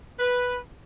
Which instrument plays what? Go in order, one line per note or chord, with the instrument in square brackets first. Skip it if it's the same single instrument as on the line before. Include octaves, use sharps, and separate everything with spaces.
[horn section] B4